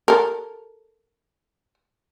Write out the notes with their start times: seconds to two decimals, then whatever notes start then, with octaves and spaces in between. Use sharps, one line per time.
0.08 A4 A#4